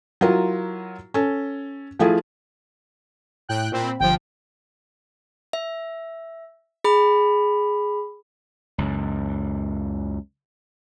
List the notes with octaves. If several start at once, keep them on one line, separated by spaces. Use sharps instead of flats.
F#3 E4 F4 A#4
C#4 A4
F3 A3 E4 F4 G#4
A2 G5 F#6
A#2 C4 B5
G1 F3 G5
E5
G#4 B5
C#2 F#2